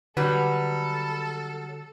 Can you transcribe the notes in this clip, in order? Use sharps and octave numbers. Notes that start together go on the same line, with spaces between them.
D3 F#3 G3 A4 B4